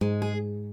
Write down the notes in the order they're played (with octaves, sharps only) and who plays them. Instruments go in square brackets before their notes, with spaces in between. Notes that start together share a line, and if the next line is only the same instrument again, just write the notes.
[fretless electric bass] G#2 [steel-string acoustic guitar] G#3
[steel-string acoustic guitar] G#4